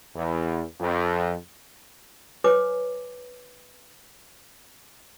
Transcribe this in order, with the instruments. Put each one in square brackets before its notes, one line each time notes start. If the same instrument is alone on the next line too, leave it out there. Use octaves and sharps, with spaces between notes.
[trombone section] E2
F2
[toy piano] B4 C#5 G#5 D6